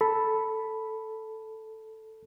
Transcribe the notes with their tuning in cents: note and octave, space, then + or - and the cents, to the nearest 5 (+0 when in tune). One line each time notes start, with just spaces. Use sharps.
A4 +0 B5 +0